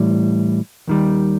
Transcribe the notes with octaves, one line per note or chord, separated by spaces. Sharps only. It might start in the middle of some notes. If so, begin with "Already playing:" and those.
Already playing: A2 E3 G3
D#2 D#3 G3